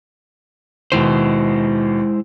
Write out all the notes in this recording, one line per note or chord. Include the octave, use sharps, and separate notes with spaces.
D#2 B2 G#3 E4 C5